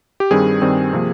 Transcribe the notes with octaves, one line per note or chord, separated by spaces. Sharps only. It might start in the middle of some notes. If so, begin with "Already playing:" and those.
G4
G2 D#3 G3 C4 G#4
G2 D#3 G3 C4
C3 F3 A#3